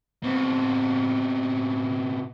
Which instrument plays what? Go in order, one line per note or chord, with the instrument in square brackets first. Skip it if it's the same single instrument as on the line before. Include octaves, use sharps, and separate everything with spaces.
[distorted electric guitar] B2 C4